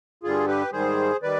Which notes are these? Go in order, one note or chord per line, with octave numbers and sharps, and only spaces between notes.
G2 D3 G3 F4 G#4
G4 B4
G#2 D#3 G3 G#4 C5
D#3 G3 B4 D5